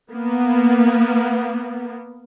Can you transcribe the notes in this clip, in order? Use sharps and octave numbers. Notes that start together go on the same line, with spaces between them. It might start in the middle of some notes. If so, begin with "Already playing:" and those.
A#3 B3